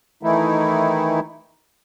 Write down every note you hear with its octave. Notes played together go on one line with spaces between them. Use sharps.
D#3 E3 A3 D#4 E4